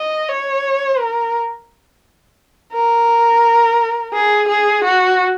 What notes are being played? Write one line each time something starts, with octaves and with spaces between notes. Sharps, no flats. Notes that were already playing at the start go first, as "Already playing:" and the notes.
Already playing: D#5
C#5
A#4
A#4
G#4
G#4
F#4